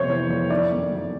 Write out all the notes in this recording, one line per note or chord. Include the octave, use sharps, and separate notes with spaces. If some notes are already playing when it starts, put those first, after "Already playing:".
Already playing: F2 C3 C5 C#5
E3
F2
D#3 D5
F#2
F#3